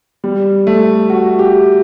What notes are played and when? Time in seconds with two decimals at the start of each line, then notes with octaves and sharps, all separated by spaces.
0.24 G3
0.67 A3
1.10 F#4
1.39 G4